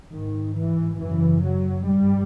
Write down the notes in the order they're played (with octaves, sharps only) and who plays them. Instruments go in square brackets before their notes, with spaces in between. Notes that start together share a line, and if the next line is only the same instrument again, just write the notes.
[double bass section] G#2 D#3
E3
F#2 C#3 E3
F#3
G2 G3